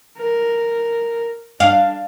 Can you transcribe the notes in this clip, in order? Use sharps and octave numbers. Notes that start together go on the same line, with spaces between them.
A#4
D4 F5